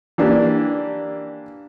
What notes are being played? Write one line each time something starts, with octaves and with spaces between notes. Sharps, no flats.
E3 A#3 D4 G4